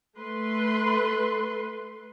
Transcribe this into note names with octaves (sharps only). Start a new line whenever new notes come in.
A3 B4 C6